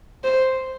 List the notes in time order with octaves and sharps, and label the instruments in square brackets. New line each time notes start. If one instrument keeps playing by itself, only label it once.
[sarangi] C5